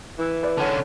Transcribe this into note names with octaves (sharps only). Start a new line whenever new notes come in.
E3
B4 D5
D3 C#4 C#5 F#5 A5